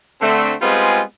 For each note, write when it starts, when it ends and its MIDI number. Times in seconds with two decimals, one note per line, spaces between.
0.22 0.53 50
0.22 0.53 57
0.22 0.53 60
0.62 1.01 55
0.62 1.01 56
0.62 1.01 59
0.62 1.01 60
0.62 1.01 65
0.62 1.01 68